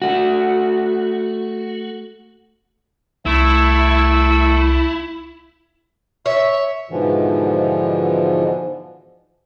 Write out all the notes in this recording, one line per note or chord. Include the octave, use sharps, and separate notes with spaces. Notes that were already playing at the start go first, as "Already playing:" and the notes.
A3 F#4
C2 A3 E4 E6
C#5 E5
G#2 B2 D3 E3 F3